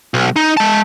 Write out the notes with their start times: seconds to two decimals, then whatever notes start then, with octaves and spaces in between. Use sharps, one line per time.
0.14 B1
0.36 D#4
0.57 G#3 A5